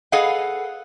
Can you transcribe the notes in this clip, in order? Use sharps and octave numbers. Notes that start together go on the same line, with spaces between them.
G#4 A4 B4 D#5 F5 F#5